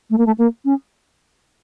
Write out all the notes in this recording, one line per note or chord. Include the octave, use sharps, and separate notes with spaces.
A3
A#3
A3
A#3
C#4